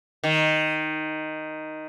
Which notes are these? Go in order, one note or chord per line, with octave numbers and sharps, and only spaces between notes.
D#3